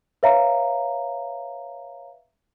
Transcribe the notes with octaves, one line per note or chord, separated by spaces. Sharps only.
B4 C#5 E5 F5 A#5